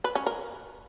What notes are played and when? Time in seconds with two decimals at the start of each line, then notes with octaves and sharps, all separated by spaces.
0.04 B4
0.15 C#4
0.26 A#4